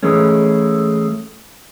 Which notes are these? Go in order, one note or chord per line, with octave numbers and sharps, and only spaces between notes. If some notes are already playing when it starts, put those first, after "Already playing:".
E3 G#3 A3 C#4